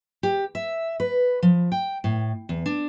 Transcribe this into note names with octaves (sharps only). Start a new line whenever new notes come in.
G4
E5
B4
F3
G5
A2
E2
D4